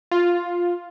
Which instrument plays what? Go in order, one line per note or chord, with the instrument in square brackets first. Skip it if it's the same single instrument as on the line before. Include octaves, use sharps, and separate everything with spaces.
[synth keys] F4